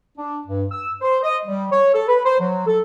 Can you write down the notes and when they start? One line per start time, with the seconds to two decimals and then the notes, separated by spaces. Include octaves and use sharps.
0.18 D4
0.47 G2
0.71 E6
1.01 C5
1.23 D#5
1.46 G3
1.72 C#5
1.94 A4
2.08 B4
2.25 C5
2.39 F#3
2.66 A4